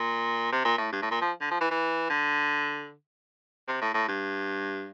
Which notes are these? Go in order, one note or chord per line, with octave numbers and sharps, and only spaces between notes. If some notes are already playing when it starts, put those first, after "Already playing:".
Already playing: A#2
C3
A#2
A2
G2
A2
A#2
F3
D3
F3
E3
E3
D3
C3
A2
A2
G2